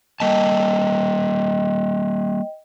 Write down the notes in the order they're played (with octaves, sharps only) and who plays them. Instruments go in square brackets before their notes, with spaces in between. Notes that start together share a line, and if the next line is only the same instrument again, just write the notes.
[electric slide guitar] G3 A#3 A5 [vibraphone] D#5 G5